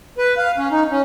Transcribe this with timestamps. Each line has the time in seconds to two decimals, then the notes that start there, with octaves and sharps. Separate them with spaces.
0.18 B4
0.37 F5
0.57 C#4
0.71 D#4
0.91 C#4